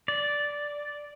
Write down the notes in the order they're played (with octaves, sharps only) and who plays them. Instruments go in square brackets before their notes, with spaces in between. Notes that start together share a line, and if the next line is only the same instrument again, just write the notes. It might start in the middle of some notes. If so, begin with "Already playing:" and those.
[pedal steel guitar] D5